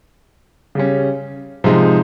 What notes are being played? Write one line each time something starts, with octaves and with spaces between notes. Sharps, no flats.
C#3 G3 C#4
C3 F3 G#3 D#4